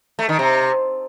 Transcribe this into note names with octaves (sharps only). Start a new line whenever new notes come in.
A3
D#3
C3